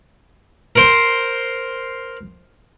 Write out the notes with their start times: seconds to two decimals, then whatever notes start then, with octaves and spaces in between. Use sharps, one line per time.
0.76 A#4 C5